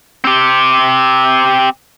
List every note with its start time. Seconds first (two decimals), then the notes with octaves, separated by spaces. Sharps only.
0.24 C4 G4